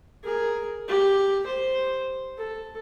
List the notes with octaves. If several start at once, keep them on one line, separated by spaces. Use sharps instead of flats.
G#4 A#4
G4
C5
A4